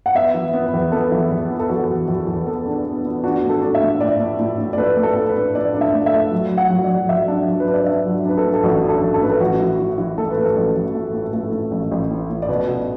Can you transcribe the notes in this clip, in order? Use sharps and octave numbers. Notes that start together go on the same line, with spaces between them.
F#5
B3 E5
E3
B3
B4
E2
B3 A4
E3
E2
B3
A4
E3 F#4
E2
E2
E2
B3 A4
D4
B3
B3
D4 F#4
A2
A4
D4
E5
A2
A2 D5
A2
A2
A2
D5
A3 B4
A2
A4
A2
B4
D4
A2 D5
D4
E5
A3
E5
A3
F#3
F#3
F#5
F#3
D5
F#3
F#3 E5
D4
F#3
B4
D4
D5
D4 E5
F#3
D4 B4
A4
A2
A4
A1 F#4
D4
A4
A1
A4
A2 B4
A4
A1 F#4
E3
E3
E3
A2 A4
B4
A3
A4
A1
A1
A3
A2
A3
A2
A1
A1
A2
A2
D5
B2 B4
B2